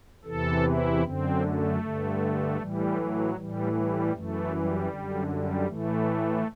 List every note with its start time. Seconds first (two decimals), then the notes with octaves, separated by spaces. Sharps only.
0.25 E2 C3 E3 A4
0.63 E4
1.01 F#2 D3 C4
1.41 A3
1.80 G2 D3
2.57 A2 E3 G3
2.96 F#3
3.34 A2 E3 G3
3.72 G3
4.12 F#2 E3 A3
4.50 G3
4.88 F#2 D3
5.27 G3
5.65 A2 E3 A3